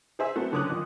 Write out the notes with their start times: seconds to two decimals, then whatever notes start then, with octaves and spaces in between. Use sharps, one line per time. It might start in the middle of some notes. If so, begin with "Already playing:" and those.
0.19 G#4 C5 E5 G#5
0.36 A3 B3 C4 F#4
0.52 F2 D3 C#4 D6 D#6 F#6
0.69 A#2 D#3